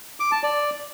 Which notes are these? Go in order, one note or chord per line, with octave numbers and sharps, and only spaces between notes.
D6
A5
D5